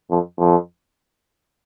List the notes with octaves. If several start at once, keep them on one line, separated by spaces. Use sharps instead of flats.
F2
F2